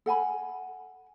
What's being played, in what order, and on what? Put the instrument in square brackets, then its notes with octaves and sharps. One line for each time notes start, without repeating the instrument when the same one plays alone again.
[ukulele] A4 F#5 G#5 B5